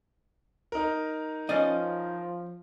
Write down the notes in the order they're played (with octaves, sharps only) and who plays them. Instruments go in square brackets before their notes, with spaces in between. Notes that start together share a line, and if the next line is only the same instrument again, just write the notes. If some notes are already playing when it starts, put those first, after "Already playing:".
[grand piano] D#4 A#4
[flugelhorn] F3 [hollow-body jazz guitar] C#4 D5 D#5